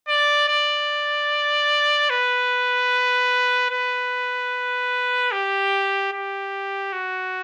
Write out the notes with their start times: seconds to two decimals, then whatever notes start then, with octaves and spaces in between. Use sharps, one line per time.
0.08 D5
0.48 D5
2.10 B4
3.70 B4
5.32 G4
6.12 G4
6.92 F#4